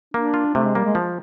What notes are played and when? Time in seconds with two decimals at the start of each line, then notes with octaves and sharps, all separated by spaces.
0.14 A#3 D4
0.34 F4
0.55 C3 A3
0.64 G#3
0.75 G3 A#3
0.85 G#3
0.95 F3